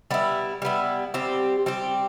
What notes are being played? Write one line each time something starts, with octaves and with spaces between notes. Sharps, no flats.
G3 B3 E4
G3 B3 E4
G3 C4 G4
G3 C4 G4